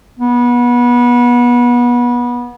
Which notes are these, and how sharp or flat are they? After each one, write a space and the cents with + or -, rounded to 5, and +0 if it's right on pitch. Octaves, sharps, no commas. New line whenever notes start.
B3 -25